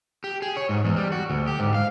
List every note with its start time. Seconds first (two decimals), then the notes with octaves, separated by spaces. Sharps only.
0.24 G4
0.42 G#4
0.57 C#5
0.69 G#2
0.85 E2
0.96 G3
1.12 F#4
1.30 D2
1.47 G4
1.59 G#2
1.74 F5